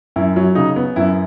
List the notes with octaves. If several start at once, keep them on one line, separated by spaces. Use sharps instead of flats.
F#2 E4
F#3
C#3 D#4
B3
F#2 E4